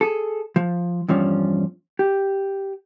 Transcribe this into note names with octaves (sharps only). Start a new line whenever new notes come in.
G#4 A4
F3
E2 G2 F3 C#4
G4